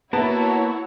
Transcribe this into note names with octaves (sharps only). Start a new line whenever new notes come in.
A#3 B3 E4 F#4 C#5 E5 A5